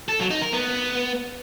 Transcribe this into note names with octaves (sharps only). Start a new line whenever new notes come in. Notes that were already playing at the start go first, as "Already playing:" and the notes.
A4
F#3
D#4
A#4
B3